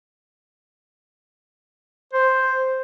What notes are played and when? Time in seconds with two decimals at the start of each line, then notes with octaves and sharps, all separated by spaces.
2.13 C5